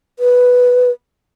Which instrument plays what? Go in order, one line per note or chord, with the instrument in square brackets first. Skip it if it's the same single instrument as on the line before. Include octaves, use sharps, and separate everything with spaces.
[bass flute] B4